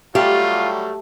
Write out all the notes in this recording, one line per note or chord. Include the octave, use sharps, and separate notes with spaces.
F#3 G3 A3 F4 G4